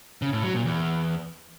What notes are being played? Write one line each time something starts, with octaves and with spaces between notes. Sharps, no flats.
C#3
A2
F#3
A#2
E2